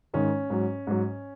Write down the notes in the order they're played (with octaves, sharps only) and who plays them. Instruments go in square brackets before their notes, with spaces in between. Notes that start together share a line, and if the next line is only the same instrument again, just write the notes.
[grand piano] G#2 D#3 G#3 C#4
G#2 F#3
G#2 F#3